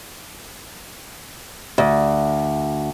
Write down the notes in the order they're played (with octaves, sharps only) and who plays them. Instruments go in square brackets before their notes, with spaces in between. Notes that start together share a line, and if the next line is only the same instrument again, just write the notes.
[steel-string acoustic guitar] D2